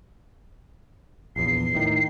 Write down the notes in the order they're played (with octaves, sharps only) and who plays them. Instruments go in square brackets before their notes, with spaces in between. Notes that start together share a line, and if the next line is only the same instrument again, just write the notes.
[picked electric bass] A#1 E2 [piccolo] C7
[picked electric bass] A2 D#3